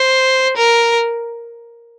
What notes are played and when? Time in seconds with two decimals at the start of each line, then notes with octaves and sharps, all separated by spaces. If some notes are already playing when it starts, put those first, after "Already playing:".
Already playing: C5
0.56 A#4